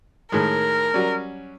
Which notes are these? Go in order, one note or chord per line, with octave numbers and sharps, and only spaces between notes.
A2 D#3 G#3 A#4
F#3 G3 C#4